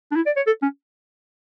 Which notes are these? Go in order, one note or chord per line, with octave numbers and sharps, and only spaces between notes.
D4
E4
D5
C#5
A4
C#4